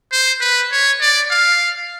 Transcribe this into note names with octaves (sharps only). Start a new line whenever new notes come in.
C5
B4
C#5
D5
F5